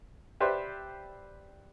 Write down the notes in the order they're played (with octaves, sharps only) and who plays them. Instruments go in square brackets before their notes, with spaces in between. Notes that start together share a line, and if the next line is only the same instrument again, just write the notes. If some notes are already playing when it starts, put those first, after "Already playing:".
[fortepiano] G4 B4 C5 D5 E5 C6